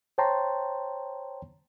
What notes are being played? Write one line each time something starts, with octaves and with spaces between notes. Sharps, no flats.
C5 C#5 G5 A5 A#5 C6